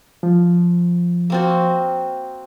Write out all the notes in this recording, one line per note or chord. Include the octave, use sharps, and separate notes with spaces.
F3
A#3 C4 F#4